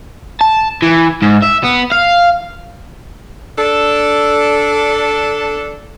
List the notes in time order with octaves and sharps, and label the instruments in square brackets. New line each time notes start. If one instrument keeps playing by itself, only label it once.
[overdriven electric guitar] A5
E3
G#2
E5
B3
F5
[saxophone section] D4 A4